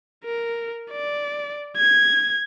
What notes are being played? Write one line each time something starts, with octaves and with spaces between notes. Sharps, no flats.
A#4
D5
G#6